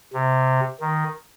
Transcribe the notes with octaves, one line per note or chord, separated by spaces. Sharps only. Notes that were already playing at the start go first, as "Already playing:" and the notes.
C3
D#3